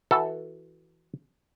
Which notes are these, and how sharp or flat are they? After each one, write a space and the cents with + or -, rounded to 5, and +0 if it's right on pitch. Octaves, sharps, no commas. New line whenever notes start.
E3 -15 F#4 +0 A4 +0